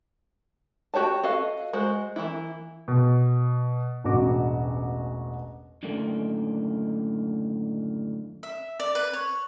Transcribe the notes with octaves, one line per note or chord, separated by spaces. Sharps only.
F#4 G4 C#5 A5
F#4 A4 D#5 F5
G#3 F#4 C5
E3 F3 A#3 E4
B2
E1 A1 F#4 D6
F#2 A2 D3 D#3 A3 A#3
E5
D5
B4
C#5